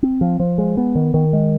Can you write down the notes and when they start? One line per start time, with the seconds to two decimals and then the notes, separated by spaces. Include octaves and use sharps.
0.03 C4
0.21 F3
0.40 F3
0.58 G#3
0.77 B3
0.95 D#3
1.14 D#3
1.33 G#3